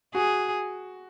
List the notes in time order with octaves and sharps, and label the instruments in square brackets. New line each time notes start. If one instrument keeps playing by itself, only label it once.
[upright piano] F#4 [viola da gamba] G#4